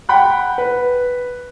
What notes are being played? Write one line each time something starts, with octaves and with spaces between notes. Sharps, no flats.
F#5 G5 B5 F#6
B4